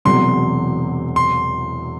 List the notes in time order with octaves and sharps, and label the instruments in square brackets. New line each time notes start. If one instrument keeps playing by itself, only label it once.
[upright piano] E1 E2 C3 F#3 [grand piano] C6
[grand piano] C6